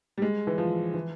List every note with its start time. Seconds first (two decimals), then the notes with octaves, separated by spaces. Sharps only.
0.18 G3
0.22 G#3
0.47 E3
0.58 F3
0.94 E3